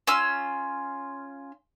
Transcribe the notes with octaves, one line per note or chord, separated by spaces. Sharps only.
C#4 F4 E6